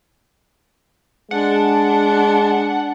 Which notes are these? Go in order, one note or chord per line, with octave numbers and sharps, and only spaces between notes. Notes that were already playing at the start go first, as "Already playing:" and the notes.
G#3 D4 F#5